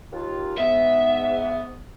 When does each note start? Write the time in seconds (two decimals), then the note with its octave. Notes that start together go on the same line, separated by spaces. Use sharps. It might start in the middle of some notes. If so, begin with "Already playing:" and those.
0.12 D#2 F4
0.58 G#2 B3 E5